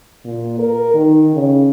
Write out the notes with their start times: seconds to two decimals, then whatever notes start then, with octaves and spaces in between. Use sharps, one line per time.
0.25 A#2
0.59 A#4
0.94 D#3
1.35 C#3